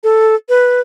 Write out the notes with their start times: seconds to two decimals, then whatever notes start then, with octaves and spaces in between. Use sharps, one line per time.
0.04 A4
0.49 B4